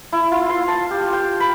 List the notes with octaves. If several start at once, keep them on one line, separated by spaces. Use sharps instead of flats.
E4
F4
C6
A5
G4
G5
B5